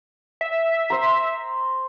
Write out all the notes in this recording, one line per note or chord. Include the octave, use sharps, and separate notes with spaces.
E5
C5 A#5